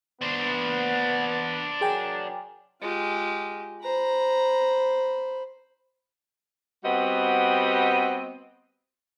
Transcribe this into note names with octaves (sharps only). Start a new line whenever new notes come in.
B3 D4 C5
F#3 G#4 A#4 G5 G#5
G#3 F4 G4
C5 A#5 B5
G3 B3 C4 F#4 D#5